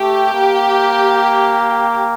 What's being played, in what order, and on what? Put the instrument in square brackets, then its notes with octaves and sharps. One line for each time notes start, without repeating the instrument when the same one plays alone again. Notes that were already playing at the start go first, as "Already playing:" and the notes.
Already playing: [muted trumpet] A3 [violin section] G4
[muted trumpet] A#3